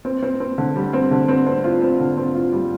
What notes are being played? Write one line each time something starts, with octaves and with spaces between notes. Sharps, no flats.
C4
C4
C4
D3
G3
C4
D3
C4
C4
F4
C4
D3
C4
F4
G3